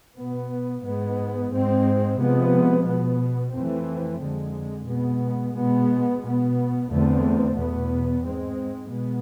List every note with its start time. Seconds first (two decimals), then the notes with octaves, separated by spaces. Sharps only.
0.16 B2 B3
0.84 G#2 G#3 B3
1.50 G#2 G#3 C4
2.19 C3 F3 G#3 B3
2.86 B2 B3
3.52 F2 E3 A3 C4
4.20 F2 D3 G#3
4.87 B2 G#3 B3
5.55 B2 G#3 B3
6.21 B2
6.26 B3
6.89 E2 D3 A3 C4
7.56 E2 B2 B3
8.23 G#2 G#3 C4
8.90 B2 G#3 B3